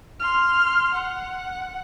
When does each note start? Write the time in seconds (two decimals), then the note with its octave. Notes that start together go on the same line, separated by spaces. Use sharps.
0.20 C6 F6
0.94 F#5